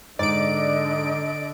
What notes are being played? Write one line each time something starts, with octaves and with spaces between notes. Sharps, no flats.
G#2 D3 D5 D#5 D7